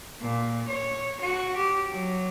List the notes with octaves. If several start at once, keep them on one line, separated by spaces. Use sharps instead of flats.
A#2
C#5
F#4
G4
F#3